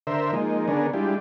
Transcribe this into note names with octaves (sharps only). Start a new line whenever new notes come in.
D3 A#4 C5 E5
F3 G#3 A#3 D#4
D3 B3 C#4 D4 G#4 A#4
G3 G#3 D4 E4 F4 G4